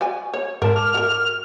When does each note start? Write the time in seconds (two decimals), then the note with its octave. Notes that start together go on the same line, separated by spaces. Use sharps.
0.01 F#4 D5 G#5
0.34 C#5
0.62 G#2 A#4 A5 E7
0.76 D6 F6
0.94 F#4 A#4